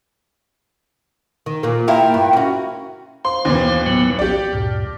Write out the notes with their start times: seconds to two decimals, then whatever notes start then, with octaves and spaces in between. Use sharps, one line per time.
1.46 D#3
1.63 A#2 A#3
1.88 E4 F4 A#4 G5
2.14 G2
2.33 C#4 F#4
3.25 C5 F5 C6
3.45 D#2 B2 E3
3.86 A2 F#3 B3
4.19 A#1 G4 D5
4.53 D2 G2 A#2